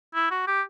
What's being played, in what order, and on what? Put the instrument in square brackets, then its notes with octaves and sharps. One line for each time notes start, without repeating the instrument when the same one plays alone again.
[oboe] E4
F#4
G4